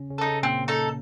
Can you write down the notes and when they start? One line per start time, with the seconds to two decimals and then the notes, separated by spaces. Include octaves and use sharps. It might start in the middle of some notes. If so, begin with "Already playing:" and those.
Already playing: C#3 C#4
0.10 C#3 C#4
0.18 D#4 A4
0.27 C#3 C#4
0.43 A#2 A#3 C4
0.68 D#4 A4